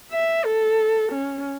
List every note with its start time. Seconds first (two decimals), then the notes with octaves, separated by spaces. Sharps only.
0.11 E5
0.45 A4
1.12 C#4